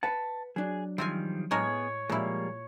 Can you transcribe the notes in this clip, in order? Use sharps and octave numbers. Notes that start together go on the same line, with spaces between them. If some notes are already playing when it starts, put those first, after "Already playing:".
B4 F#5 A5
F#3 D4 G#4
D#3 F3 G3 C4 F4 G#5
A2 G#3 B3 G#4 A#4 C#5
A#2 F3 G3 G#3 A#3 E4